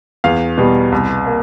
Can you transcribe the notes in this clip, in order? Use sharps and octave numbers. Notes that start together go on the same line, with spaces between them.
E2 F5
B2 G3
C2
A#3